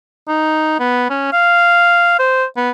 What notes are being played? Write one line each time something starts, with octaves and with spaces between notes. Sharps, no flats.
D#4
B3
C#4
F5
C5
B3